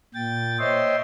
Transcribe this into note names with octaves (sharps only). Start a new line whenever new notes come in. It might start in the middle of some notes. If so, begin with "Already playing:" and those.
A#2 G5 A6
C5 C#5 D#5 E5 G5 C6